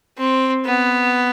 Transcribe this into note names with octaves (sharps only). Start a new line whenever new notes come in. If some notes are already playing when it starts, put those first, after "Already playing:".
C4
B3